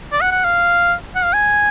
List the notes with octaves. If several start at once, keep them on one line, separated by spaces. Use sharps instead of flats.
D5
F#5
F#5
F5
F#5
F5
G#5